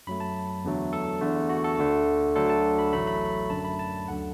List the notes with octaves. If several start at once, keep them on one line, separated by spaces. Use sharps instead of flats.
F#2 F#3 A3 B5
A5
E2 D3 F#3 A3
A4
E2 D3 A3
F#4
A4
D2 D3 A3
D2 D3 F#3 A3 A4
A5
B5
A1 A2 F#3 A3 B5
B5
F#2 D3 A3 A5
B5
A5
D2 D3 F#3 F#5